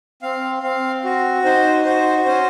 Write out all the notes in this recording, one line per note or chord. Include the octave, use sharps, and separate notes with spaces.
C4 F5
C4 F5
F#4
D#4 C5
F#4 C5
C#4 C5